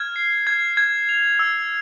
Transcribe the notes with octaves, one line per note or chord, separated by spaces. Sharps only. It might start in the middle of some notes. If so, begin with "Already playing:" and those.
Already playing: F6 G#6
C7
G#6
G#6
F7
E6